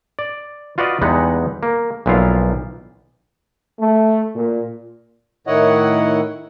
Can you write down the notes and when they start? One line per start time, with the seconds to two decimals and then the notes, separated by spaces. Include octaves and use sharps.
0.19 D5
0.78 F4 F#4 B4 D5 D#5 F5
1.02 E2 G3 G#3 B3 D#4 F#5
1.63 A#3
2.06 B1 A#2 F3 E4 F4 F5
3.80 A3
4.36 A#2
5.47 A2 D#3 E4 C#5 D#5 F#5